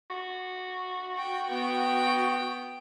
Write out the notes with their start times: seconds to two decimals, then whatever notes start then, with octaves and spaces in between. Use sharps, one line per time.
0.10 F#4
1.18 G5
1.50 B3 G5